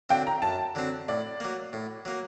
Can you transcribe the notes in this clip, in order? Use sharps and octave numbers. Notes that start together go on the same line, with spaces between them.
D3 F#3 C4 G5
A#5
F#2 A5
D3 F#3 C4
A2 D5
F#3 A#3
A2
F#3 A#3